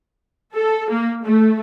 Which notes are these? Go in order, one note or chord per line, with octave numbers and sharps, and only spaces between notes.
A4
A#3
A3